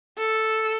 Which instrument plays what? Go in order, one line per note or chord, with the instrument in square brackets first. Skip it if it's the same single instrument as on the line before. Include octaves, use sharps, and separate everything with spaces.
[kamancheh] A4